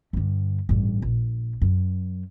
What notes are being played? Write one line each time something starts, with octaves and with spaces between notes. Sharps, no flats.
G2 D3
A1 G2
A#1
F#2